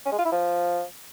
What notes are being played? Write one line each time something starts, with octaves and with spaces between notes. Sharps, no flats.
C#4
G#3
F4
E4
F3